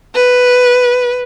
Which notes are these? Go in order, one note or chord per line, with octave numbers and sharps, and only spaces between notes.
B4